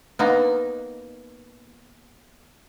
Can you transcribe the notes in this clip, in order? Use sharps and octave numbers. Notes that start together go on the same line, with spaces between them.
A#3 B3 D#4